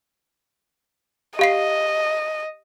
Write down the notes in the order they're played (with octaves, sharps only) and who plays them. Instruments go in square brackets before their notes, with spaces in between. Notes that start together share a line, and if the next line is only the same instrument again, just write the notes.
[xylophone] G4 F5 C7 [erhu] D#5